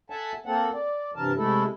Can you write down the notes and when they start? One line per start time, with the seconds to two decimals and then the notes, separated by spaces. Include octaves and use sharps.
0.10 A4 E5 F#5 G#5 A5
0.46 A#3 C4 A4 F#5
0.73 D5
1.16 G2 C3 E3 A#4 A5
1.37 C3 G#3 A3 E4 A4